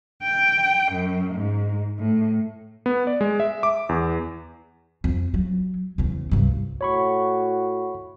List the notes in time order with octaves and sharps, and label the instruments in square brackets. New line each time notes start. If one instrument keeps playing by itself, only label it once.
[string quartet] G5
F#2
G#2
A2
[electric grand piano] B3
D5
G#3
E5
D6
E2
[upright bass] F2
F#3
E2 C#3
C2 G2
[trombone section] A2 F#4 [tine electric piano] C#5 B5 C#6